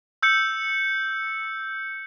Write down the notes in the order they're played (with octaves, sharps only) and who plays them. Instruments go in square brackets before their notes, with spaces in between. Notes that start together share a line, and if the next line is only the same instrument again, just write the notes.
[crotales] E6 G6 C#7